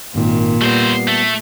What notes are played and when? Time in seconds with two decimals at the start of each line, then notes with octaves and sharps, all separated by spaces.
0.15 G#1 A#2 D#3
0.62 G3 A3 B3 C5
1.08 A3